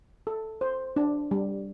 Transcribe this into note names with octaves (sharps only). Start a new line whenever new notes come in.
A4
C5
D4
G3